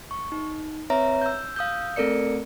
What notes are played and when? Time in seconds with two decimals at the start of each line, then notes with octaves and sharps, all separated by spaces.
0.11 C#6
0.32 D#4
0.90 C4 B4 C#5 E5 A#5 A#6
1.22 E6 G6
1.56 F5 D#6 E6 G6
1.96 A3 C4 A4 A#4 D5 C#7